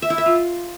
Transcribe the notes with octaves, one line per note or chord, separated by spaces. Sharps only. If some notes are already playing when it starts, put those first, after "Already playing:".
E5
E4
E5
F4